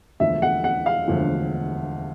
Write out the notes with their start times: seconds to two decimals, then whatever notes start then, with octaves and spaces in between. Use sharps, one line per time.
0.20 E1 D2 D3 F3 E5
0.42 F#5
0.64 F#5
0.86 F5
1.08 E1 D2 D3 F3